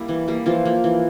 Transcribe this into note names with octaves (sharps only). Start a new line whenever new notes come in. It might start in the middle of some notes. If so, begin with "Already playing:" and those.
Already playing: G3 A#3 E4
E3
G3 A#3
E3 F3 F4
A#3
E3